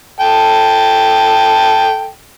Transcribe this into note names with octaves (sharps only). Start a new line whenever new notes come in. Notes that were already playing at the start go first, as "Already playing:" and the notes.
A4 G5 A5